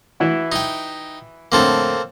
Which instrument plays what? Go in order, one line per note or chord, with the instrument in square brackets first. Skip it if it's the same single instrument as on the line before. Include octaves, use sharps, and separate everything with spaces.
[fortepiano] E3 E4 F#4
[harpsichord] D#4 G5
[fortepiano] F2 A2 D3 [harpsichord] A#3 C4 A4